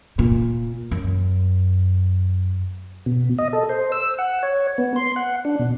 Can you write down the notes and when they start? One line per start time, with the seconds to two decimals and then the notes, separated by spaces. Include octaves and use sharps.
0.19 A#2
0.91 F#2
3.06 B2
3.38 D#5
3.53 A4
3.69 C5
3.92 E6
4.18 F#5
4.43 C#5
4.78 B3
4.96 C6
5.16 F#5
5.45 D4
5.60 B2